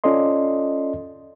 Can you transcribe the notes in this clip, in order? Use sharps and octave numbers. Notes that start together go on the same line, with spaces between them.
C#4 F4 A4 D5 D#5 C6